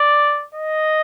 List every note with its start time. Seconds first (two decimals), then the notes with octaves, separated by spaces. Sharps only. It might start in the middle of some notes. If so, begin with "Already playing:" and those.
Already playing: D5
0.55 D#5